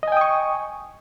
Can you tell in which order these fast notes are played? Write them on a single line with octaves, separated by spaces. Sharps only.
D#5 G#5 G5 D#6 C#6